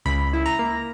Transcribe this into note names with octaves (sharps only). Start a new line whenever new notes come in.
C#2 B5
E4
A#5
A#3